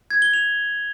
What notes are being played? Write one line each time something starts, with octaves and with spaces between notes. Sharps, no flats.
G#6
G7
F7